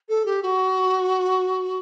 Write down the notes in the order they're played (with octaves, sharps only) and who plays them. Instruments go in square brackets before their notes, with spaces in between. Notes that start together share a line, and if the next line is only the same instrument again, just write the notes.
[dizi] A4
G4
F#4